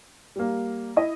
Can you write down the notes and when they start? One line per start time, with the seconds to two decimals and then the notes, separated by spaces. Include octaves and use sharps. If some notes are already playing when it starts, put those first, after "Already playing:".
0.36 G3 A#3
0.96 E4 D#5